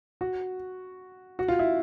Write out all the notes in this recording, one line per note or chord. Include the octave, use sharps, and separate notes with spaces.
F#4
F#4
F4
E4